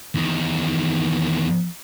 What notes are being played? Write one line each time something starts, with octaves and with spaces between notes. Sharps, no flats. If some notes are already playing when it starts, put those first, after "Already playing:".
E2 D#3